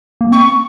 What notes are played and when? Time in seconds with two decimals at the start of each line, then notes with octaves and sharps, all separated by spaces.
0.21 A#3
0.32 C4 C#6